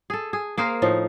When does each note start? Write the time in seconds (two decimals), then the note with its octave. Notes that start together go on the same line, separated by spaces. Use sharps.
0.10 G#4 A4
0.33 G#4
0.58 A#3 G#4 A#4 C5
0.82 A2 F3 D#4